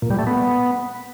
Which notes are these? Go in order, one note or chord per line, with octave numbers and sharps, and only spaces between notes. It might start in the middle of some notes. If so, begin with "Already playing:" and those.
A#2
G3
A3
B3